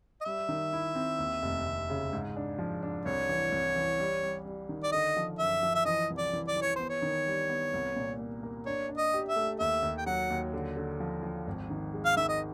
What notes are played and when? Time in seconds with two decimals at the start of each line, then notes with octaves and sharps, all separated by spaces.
0.21 D#5
0.25 G3 E5
0.49 D#3
0.73 E4
0.95 C4
1.18 D#2
1.42 F1
1.65 F1
1.90 C#3
2.13 G#2
2.36 D4
2.58 F3
2.83 D4
3.05 C2 C#5
3.29 E3
3.52 C2
3.76 E3
3.99 G3
4.23 G3
4.46 G3
4.69 D#3
4.83 D5
4.92 D3 D#5
5.16 F3
5.39 F#2 E5
5.63 F3
5.75 E5
5.85 E3 D#5
6.10 C2
6.18 D5
6.33 E3
6.48 D5
6.56 E3
6.62 C#5
6.76 B3 C5
6.90 C#5
7.02 D#3
7.27 G3
7.49 B3
7.73 C2
7.96 A#2
8.19 A#3
8.43 A#3
8.66 D4 C#5
8.89 D4
8.98 D#5
9.13 G4
9.29 E5
9.36 A3
9.59 D#2 E5
9.82 D#2
9.98 G5
10.06 F#3 F#5
10.30 D#2
10.53 D3
10.77 D3
11.00 F3
11.23 F3
11.47 G#1
11.70 D#3
11.94 G#3
12.06 F5
12.17 D#3 E5
12.29 D#5